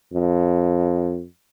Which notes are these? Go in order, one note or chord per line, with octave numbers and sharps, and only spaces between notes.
F2